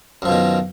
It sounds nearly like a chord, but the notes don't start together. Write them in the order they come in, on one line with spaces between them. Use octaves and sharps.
F#2 F3 B2 D#3